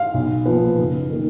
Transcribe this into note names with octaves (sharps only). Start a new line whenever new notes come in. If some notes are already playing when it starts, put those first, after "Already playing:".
Already playing: F5
B1
A#2 F3 B3
F#1
D#3 A#3